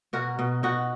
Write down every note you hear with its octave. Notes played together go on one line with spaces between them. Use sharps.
B2 F#4 A#4
B2
B2 D#4 F#4